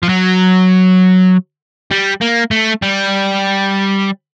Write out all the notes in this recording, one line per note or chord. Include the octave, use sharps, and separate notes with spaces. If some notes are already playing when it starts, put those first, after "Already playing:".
F3
F#3
G3
A#3
A3
G3